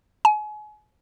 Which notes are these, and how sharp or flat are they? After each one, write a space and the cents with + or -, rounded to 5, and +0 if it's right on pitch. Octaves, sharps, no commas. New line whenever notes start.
G#5 +35